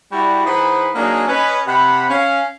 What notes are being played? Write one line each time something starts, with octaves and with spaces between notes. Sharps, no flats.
G3 E4 F#4
E3 D#4 G#4 C5 F#5 B5
F#3 A#3 D4 D#4 G#4
C#4 B4 D#5
C3 F#5 B5
C#4 F5